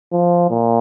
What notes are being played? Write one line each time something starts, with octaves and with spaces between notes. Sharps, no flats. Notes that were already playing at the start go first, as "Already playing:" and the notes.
F3
A#2